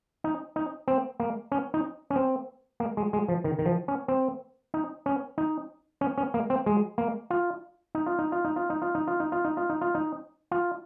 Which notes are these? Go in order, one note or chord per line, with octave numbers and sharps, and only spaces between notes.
D#4
D#4
C4
A#3
C#4
D#4
C#4
C4
A#3
G#3
G#3
F3
D#3
D#3
F3
C#4
C4
D#4
C#4
D#4
C#4
C#4
A#3
C4
G#3
A#3
F4
D#4
F4
D#4
F4
D#4
F4
D#4
F4
D#4
F4
D#4
F4
D#4
F4
D#4
F4
D#4
F4